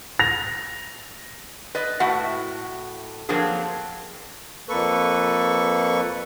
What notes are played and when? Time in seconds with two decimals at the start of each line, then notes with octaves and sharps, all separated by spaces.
0.19 A#6 F7
1.75 B4 D5 D#5
2.00 A2 A3 E4 F#4 F#5
3.29 F3 F#3 A#3 C4 D4 G#4
4.69 F2 A#3 A4 B4 C#6